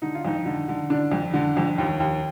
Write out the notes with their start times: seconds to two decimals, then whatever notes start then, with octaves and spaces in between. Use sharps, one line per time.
0.02 D3 D#4
0.15 F4
0.25 F2 D#4
0.46 D3
0.68 D3
0.90 D3 D4
1.12 F2
1.34 D3
1.57 F2
1.78 D#2
2.00 D#2